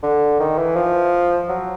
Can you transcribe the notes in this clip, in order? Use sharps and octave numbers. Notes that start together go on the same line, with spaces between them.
D3
D#3
E3
F3
F#3